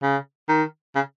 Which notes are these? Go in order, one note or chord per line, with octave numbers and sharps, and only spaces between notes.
C#3
D#3
C#3